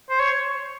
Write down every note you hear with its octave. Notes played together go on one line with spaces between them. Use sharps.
C5
C#5